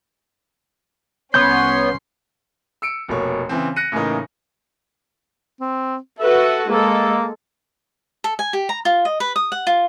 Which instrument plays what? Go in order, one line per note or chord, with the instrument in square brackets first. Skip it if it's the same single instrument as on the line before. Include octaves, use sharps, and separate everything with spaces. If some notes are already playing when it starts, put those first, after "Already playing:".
[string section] C2 C#4 C6 [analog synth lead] B3 [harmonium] C#5 [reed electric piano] G6
[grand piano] E6 C#7 D7
F1 B2 A#3 C#5
C#3 E3 C4
F#6 A#6 C#7 D#7
A2 C#3 E3 A#3 D#4
[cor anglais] C4
[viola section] F#4 A4 B4 [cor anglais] E5
[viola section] G#3 A4 [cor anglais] A#3
[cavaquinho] A4
G#5
G4
A#5
F4
D#5
B4
D#6
F#5
F4